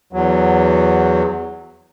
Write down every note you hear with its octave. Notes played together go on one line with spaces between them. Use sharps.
E2 F#3